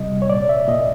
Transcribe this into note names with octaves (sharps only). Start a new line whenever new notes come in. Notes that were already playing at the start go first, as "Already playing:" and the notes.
Already playing: C3 G3 D#5
C#5
A#2 D5
E5
A#2 D#5